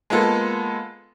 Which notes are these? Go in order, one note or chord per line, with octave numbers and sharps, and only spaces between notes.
G#3 A#3 B3 F4 A4